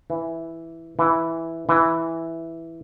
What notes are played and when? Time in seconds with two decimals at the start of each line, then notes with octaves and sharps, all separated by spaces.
0.10 E3
0.99 E3
1.69 E3